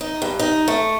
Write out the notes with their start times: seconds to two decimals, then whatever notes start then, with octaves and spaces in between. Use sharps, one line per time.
0.01 D#4
0.22 G2
0.39 D#4
0.68 A3